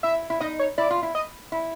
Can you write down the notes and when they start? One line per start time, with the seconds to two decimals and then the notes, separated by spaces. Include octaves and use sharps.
0.03 E4 E5
0.30 E4
0.40 D#4 D#5
0.59 C#5
0.78 E4 D5
0.90 F4
1.03 E4
1.15 D#5
1.52 E4